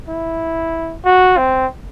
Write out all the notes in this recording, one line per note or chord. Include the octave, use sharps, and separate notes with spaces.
E4
F#4
C4